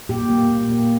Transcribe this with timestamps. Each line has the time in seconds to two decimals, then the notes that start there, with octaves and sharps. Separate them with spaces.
0.09 A#2 G4
0.30 A#3
0.50 A#2
0.70 A#3